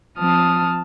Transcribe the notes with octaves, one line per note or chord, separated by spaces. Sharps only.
F3 C4 A5 D#6 F6